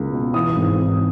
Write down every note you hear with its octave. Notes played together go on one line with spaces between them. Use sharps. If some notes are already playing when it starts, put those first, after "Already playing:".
Already playing: C#2 A#3
B2
E3 D#6
G#1
G#1